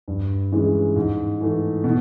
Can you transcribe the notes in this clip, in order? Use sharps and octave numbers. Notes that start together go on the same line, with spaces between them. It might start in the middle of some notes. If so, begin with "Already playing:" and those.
G2
E3 G#3 C#4
G#2
E3 A3
B2